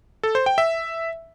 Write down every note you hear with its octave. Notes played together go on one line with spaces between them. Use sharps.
A4
C5
G5
E5